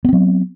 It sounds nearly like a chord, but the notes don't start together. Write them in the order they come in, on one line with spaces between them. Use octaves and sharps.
B3 C4 F#3